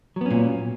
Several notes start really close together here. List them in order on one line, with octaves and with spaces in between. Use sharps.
F#3 B3 C#4 A#2